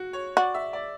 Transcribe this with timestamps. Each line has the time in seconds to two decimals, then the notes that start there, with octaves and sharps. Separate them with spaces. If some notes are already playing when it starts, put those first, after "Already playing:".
Already playing: F#4
0.13 C#5
0.37 F#4 D5
0.54 E5
0.73 D5